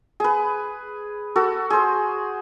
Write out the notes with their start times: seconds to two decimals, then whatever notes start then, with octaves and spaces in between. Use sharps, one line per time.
0.20 G#4 B4
1.36 F#4 A4
1.70 G#4 C5